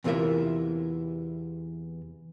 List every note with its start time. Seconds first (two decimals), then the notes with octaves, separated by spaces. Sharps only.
0.04 E2 C3 E3 F4 A#4 E5